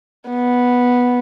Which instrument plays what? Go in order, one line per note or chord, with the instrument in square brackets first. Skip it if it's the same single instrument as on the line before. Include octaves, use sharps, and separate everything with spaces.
[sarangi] B3